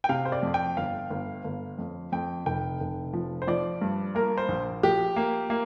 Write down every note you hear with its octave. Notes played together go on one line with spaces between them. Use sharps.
G5
C3 F5
C5
D5
F2
G5
G1 F5
G1
G1
F2
F2 G5
F1 G5
F1
F3
C5
F3 D5
G2
A#3 A#4
C5
A#1
F3 G4
A#3
A#3